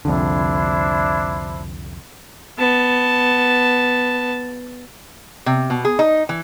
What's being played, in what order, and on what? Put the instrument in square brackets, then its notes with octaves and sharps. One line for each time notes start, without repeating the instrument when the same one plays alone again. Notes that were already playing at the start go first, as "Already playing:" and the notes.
[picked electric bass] C2 F2 D3 [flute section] D4 E4 C5
[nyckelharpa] B3 A5
[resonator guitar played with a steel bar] C3
B2
G#4
D#4
E3